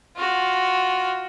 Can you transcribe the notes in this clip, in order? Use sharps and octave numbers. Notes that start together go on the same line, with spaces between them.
F4 F#4